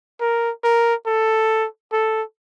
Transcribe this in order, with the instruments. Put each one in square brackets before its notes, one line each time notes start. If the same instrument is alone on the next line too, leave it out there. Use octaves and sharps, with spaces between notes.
[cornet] A#4
A#4
A4
A4